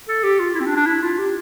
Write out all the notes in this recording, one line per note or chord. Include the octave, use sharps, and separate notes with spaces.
A4
G4
F4
E4
C4
D4
D4
E4
F4
G4